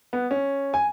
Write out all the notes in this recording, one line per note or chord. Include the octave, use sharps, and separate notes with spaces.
B3
C#4
G#5